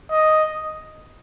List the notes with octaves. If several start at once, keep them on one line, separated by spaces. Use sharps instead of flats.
D#5